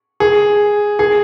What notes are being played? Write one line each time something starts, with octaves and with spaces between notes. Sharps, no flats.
G#4
G#4